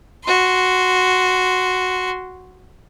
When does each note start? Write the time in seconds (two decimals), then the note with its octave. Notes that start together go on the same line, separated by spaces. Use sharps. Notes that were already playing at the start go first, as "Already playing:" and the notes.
0.25 F#4 C6